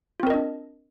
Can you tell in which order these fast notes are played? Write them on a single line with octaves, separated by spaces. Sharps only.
F4 C4 A#4 D#5 D4